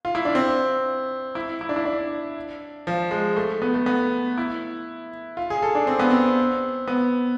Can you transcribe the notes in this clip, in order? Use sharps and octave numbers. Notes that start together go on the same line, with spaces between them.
F4
E4
D4
C4
E4
E4
D4
E4
D4
F3
G#3
A3
B3
A3
B3
E4
F4
G#4
A4
D4
C4
B3
C4
B3